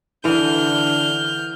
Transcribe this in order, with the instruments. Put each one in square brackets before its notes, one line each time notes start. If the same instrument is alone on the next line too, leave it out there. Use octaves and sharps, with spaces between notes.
[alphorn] D3 [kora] E3 [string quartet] F6 G6